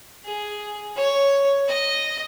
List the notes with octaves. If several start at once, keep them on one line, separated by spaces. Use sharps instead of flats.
G#4
C#5
D#5